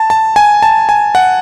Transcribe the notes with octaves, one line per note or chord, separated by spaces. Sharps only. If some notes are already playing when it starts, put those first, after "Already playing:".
Already playing: A5
A5
G#5
A5
G#5
F#5